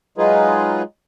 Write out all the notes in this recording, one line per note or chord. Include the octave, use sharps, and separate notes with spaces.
F#3 G#3 D#4 F4 G#4 B4